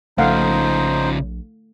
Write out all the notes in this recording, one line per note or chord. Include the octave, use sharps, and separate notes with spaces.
A#1 C#3 F3 A3 D#4 C5 F5 F#5